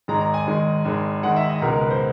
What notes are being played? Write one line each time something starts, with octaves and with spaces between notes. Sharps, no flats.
G#1 G#2 D#3 G#3 A#5
A#5
G#5
G#1 G#2 D#3 G#3
G#1 G#2 D#3 G#3
G#1 G#2 D#3 G#3 F#5
E5
D#5
C#2 B2 G#3 A#4
A#4
B4
C5